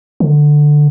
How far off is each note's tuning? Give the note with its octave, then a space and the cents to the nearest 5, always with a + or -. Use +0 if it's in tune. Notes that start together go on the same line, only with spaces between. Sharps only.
D3 +10